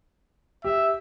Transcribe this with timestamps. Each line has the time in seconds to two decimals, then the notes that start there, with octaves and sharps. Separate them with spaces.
0.64 G4 E5